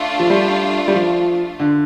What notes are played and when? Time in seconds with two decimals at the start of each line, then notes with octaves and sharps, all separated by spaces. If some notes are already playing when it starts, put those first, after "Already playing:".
Already playing: A3 D4 F4
0.20 F3
0.30 G3
0.88 G3
0.95 F3
1.60 D3